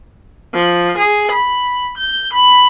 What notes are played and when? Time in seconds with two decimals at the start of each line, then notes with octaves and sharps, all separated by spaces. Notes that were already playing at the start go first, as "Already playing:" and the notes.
0.53 F3
0.97 G#4
1.30 B5
1.96 G6
2.33 B5